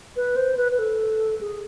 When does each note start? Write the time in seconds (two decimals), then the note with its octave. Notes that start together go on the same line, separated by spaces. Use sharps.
0.16 B4
0.36 C5
0.57 B4
0.72 B4
0.79 A4
1.41 G#4